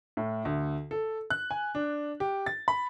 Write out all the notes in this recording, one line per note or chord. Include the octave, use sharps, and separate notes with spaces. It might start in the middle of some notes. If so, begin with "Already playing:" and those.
A2
D2
A4
F#6
G#5
D4
G4
A6
B5